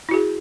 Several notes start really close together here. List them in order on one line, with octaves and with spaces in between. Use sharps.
E4 F#4 G#4